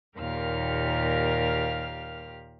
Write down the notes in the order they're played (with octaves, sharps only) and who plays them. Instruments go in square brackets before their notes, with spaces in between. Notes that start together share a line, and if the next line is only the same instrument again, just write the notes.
[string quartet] D#2 A#2 G4 A#4 F5 F6